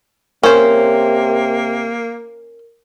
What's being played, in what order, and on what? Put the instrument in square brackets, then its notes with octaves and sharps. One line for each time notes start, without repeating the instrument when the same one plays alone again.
[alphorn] C3 [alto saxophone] A#3 [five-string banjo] C#4 C5 [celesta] A#4